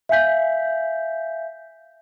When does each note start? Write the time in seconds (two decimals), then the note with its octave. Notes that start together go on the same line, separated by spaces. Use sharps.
0.09 E5 F5 G#5 G6 B6